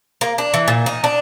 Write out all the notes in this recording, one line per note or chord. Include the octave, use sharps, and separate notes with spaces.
A#3
D4
E3
A#2
D#4
D4